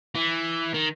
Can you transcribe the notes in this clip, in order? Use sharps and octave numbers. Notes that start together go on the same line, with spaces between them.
E3
D#3